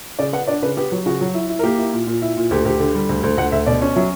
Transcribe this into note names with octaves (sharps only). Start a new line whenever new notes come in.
C#3 D5
B3 F#5
D4 D5
C#3 B4
B3 G4
F#3
C#3 F#4
F#3
E4
E4
A#4
A#3 G4
E4
A#2
A#2
E4
A#2
D2 G4
D2 G4
D3
G3
D2
D2
D2 F#5
D2 E5
B2 D5
C#4
F#3 E5